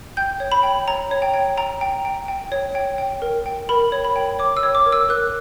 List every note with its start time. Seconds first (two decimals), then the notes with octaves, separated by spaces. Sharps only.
0.17 G5 G6
0.40 C#5
0.52 B5
0.63 G5
0.88 C#5 A#5
1.11 C#5
1.22 G5
1.34 G5
1.57 G5 A#5
1.81 G5
2.05 G5
2.28 G5
2.52 C#5
2.75 G5
2.98 G5
3.22 A#4
3.46 G5
3.69 A#4 B5
3.92 C#5
4.05 B5
4.16 G5
4.39 C#5 D6
4.57 E6
4.63 C#5
4.75 D6
4.86 A#4
4.92 E6
5.09 A#4 F#6